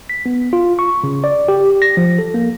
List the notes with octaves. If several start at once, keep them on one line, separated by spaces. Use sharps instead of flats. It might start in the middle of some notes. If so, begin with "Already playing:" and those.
B6
B3
F4
C#6
C#3
D5
G4
A#6
F3
A4
A#3